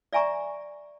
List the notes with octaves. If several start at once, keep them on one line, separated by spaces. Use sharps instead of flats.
D5 E5 G#5 A#5 C#6